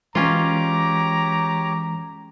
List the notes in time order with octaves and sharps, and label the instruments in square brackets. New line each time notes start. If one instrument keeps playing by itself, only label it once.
[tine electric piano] E3 G#3 [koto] C#4 F4 [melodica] G4 C#5 D6 [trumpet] A#5